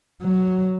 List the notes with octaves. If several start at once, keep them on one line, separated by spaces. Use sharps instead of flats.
F#3